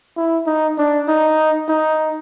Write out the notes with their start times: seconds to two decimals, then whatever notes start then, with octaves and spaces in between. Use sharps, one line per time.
0.16 E4
0.47 D#4
0.78 D4
1.08 D#4
1.68 D#4